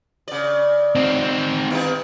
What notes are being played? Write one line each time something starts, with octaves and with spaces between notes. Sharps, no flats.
C#3 D5
C4 D#4
G2 D#3 E4